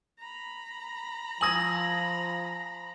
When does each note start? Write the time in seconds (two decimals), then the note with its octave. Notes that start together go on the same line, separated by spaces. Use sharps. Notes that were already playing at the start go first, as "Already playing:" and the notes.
0.19 A#5 B5
1.41 F3 G#5 D#6 G#6 A#6 F#7